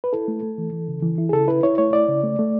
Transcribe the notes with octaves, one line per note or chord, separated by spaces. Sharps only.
B4
E4 A4
A3
A3
E3
E3
C#3
E3
E4
G#4
C#3 A4
E4 B4
E4 C#5
A3 C#5
E4 D5
C#3
A3
A3